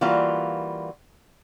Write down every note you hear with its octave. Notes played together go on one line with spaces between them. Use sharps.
E3 G3 A#3 F4 F#4